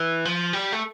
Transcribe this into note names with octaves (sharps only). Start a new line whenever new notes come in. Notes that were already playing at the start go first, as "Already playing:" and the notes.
Already playing: E3
F3
G3
A3